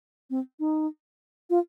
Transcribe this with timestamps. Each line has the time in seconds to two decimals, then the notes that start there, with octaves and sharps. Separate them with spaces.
0.30 C4
0.60 D#4
1.50 F4